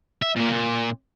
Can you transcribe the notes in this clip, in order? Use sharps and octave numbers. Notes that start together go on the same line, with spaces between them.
E5
A#2 A#3
A#2